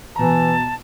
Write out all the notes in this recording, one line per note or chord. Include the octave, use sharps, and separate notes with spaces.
B2 E3 A5 A#5